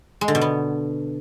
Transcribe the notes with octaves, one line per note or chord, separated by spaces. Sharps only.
G#3
D3
B2
B3